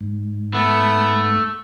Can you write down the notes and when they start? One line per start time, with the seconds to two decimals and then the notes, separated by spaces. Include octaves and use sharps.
0.01 G#2
0.54 A3 B3